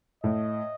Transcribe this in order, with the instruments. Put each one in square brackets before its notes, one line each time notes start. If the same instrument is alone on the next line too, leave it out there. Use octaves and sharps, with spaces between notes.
[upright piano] A2 [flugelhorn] D#5